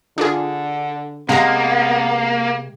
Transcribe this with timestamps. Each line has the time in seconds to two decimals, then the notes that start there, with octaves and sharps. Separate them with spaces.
0.18 D3 D4 F4 G#4
1.29 C3 G#3 A#3 B3 F5 F#5 A#5